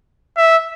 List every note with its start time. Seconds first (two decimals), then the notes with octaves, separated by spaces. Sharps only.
0.37 E5